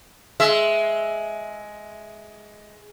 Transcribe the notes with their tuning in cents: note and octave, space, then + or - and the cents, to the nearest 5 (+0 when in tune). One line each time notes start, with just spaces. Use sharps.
G#3 +10 E5 +0